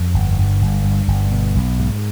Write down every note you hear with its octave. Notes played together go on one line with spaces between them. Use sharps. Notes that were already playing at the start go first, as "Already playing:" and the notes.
Already playing: F2
G1
G2
G1
G2
G1
B2
B1
G#2